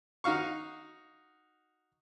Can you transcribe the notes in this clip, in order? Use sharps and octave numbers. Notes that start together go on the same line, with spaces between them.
D#4 F#4 F5 C#6